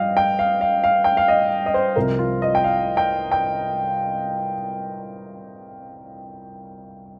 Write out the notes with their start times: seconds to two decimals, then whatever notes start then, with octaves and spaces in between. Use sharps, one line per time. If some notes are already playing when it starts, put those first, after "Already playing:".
Already playing: G2 F3 D#5 F5 G5
0.17 G5
0.39 F5
0.61 F5
0.84 F5
1.04 G5
1.17 F5
1.28 D#5
1.66 D#5
1.74 C5
1.96 C2 C3 F3 A#4
2.19 F4
2.42 D#5
2.55 G5
2.64 F5
2.97 G5
3.32 G5